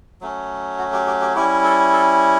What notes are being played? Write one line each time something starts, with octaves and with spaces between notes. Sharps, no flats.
F#3 A3 C#4
F#4
G4
G4
G4
G3 C#4 E4 G4
A4
A4